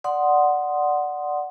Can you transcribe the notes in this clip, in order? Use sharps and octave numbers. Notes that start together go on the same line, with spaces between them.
D5 F#5 C6 D#6